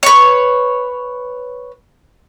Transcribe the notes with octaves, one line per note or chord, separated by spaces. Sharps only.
B4 C#5